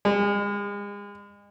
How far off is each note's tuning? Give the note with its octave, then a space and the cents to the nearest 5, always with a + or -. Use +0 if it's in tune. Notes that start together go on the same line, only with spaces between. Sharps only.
G#3 -40